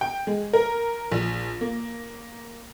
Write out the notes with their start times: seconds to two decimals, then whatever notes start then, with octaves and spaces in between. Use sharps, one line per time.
0.01 G5
0.27 G#3
0.53 A#4
1.11 A#1
1.61 A#3